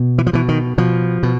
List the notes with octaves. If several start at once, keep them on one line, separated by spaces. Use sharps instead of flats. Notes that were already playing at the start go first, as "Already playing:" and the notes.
Already playing: B2
E3
F3
B2 E3
D#3
B2 F3
B2